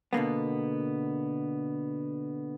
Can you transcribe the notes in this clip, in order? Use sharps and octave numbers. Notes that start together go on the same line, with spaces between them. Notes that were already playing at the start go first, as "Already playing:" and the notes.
B2 D3 A#3 B3